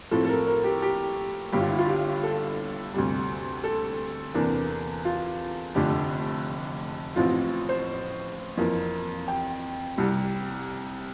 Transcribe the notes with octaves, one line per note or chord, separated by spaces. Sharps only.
A2 F3 C4 E4 A4
A4
A#4
A#4
G4
G4
G1 G2 D3 G4
F4
E4
F4
G4
A4
D2 C3 G3
A4
E2 C3 E3 A#3 D4
F4
F1 F2 D3 A3 D4 G4
A1 A2 F3 C4 F4
C5
F2 E3 A#3
G5
C2 C3 G3